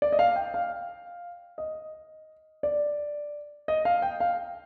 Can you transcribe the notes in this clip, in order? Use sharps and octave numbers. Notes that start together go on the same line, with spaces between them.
D5
D#5
F5
G5
F5
D#5
D5
D#5
F5
G5
F5